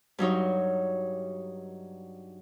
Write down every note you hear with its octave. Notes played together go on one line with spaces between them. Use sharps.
G2 F#3 D#4 C#5